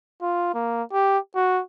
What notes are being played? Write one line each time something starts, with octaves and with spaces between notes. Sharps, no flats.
F4
A#3
G4
F#4